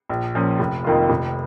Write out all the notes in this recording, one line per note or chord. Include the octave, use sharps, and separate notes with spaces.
A#1
A#2 F3 A#3 C#4
F1
F2 D#3 A#3 F4
F1